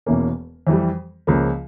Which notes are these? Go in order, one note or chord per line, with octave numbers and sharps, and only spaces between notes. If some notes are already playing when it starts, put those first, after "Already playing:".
E1 E2 E3 A#3 C#4
F2 E3 G3
C#2 C#3 F3 A#3